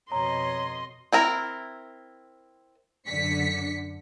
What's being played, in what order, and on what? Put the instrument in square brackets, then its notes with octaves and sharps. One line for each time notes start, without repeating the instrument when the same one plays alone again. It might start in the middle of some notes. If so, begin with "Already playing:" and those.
[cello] F2 B2 [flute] C#5 [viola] D#5 C6 [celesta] A#5
[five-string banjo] C4 E4 A#4
[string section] F#2 D3 B6 C#7